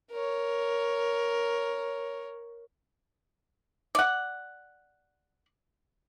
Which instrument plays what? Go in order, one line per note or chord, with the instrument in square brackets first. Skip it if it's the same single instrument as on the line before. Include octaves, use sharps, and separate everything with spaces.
[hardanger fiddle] A#4 C#5
[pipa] D5 F#5